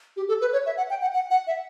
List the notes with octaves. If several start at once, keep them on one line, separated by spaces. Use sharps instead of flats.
G4
A4
B4
C#5
E5
F#5
G5
F#5
F#5
F#5
E5